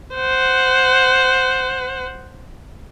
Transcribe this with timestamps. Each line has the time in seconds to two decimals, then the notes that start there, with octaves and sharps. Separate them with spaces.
0.15 C5 F#5